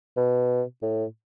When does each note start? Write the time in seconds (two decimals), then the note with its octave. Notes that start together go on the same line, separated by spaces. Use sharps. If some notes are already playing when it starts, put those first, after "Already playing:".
0.17 B2
0.82 A2